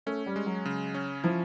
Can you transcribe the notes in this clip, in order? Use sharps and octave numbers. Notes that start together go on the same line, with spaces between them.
A3 C#4
G3
G#3
F#3
C#3
C#4
F3 E4